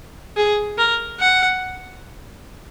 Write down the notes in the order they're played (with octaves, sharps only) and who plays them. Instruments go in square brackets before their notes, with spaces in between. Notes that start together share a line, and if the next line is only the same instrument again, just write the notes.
[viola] G#4
A#4
F#5